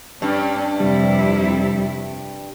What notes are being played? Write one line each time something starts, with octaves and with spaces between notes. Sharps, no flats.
G2 C#4 D4
F2 C3 G3 E4